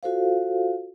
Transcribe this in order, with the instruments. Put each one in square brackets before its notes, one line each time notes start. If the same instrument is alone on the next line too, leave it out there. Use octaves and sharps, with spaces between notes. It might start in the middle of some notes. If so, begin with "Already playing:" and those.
[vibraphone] F4 F#4 A4 C5 F5